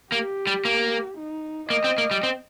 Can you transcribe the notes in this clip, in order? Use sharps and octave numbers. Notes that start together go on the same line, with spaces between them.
A#3 G4
G3
A#3
D#4
A#3 D#5
C4
A#3
G3
C4